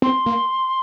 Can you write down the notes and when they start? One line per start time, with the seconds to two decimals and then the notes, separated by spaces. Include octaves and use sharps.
0.02 C4 C6
0.26 A#3